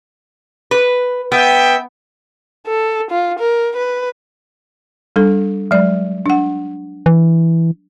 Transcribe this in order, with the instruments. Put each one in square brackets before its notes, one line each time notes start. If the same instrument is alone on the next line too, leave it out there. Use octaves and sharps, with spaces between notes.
[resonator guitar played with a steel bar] B4
[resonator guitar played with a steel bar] B3 [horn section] E5 G5
[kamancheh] A4
F4
A#4
B4
[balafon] G3 D4 A4
F#3 G#3 D5
D4 F#5
[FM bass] E3